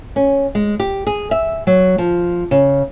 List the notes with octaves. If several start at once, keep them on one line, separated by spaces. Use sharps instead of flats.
C#4
G#3
G4
G#4
E5
F#3
F3
C#3